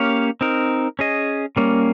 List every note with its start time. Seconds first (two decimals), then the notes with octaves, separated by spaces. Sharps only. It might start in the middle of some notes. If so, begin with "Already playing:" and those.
Already playing: A#3 C#4 G4 C#5 F5
0.41 C4 D#4 A#4
0.99 C#4 G#4 D#5
1.56 G3 A#3 C#4